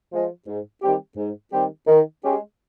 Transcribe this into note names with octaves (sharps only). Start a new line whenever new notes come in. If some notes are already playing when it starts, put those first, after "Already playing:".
F3 G#3
G#2
D#3 G3 C4 G4
G#2
D#3 G3 C4 G4
D#3
G#3 C#4 G4